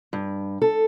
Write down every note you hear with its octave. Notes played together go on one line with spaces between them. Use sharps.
G2
A4